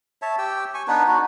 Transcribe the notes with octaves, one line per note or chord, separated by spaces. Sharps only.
C#5 E5 A5
G4 G5 E6
G#5 C#6
B3 D4 D#4 B4
D#4 F#4